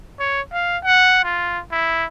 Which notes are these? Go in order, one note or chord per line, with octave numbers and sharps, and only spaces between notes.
C#5
F5
F#5
F4
E4